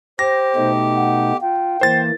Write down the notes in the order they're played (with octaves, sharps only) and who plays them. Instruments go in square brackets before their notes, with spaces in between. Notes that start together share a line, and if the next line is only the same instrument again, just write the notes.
[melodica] G4 [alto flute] C5 [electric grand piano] A#6
[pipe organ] B2 A3 D#4
[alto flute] F#5
[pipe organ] F4 [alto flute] G5
[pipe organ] E3 A#3 [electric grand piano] C5 A6